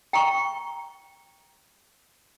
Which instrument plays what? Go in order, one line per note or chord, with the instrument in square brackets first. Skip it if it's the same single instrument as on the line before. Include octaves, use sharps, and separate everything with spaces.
[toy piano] G5 A#5 C#6